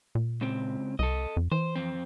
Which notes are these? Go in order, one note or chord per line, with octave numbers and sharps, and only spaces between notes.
A#2
C#2 C4
C2 A4 D#5
F2
E3 C5
F2 C4